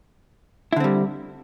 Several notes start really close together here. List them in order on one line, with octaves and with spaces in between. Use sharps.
E4 D3 C4 G3